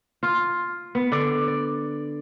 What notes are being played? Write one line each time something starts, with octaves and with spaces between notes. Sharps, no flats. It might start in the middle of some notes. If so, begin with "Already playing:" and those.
F4
B3
D3 D5
D5